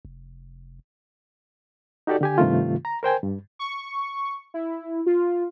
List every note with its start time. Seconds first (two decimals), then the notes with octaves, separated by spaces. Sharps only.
0.05 F1
2.07 D#4 F#4 G4 A4 D5
2.21 D3 G4 G#5
2.38 G2 C3 D#3 A3 F4
2.85 A#5
3.03 A#4 C5 G5 G#5
3.23 G2
3.59 C#6
4.54 E4
5.06 F4